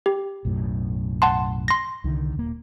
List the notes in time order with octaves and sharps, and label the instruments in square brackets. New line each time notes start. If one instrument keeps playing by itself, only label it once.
[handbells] G4
[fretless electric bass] B1 F#2 A2
[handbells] F#5 A5 C6
C6 A#6
[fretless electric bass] C2 D3 D#3
D#1 A#3